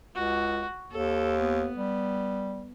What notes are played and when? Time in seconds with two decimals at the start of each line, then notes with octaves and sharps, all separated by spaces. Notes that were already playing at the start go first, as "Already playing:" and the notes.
0.15 C#2 F#4
0.91 D#2 A4
1.39 B3
1.77 G3